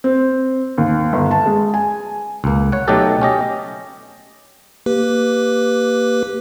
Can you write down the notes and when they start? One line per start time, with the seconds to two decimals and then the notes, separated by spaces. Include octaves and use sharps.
0.04 C4
0.78 D#2
1.13 G1
1.31 A5
1.46 G#3
1.74 G#5
2.44 C#2 A#3
2.72 C#5 F#5
2.87 B2 F#3 A3 D#4 G4 A4
3.21 C#4 G4 D#5
4.86 A#3 G4 B4